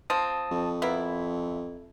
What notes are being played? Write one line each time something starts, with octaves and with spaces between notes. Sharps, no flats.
F3 C4 A5 D#6
F2
A#3 B3 E4 E5